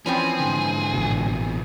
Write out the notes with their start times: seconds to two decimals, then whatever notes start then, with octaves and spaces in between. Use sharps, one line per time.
0.06 E3 F3 C4 C#4 G#4
0.40 G#2 D3
0.94 A1 B2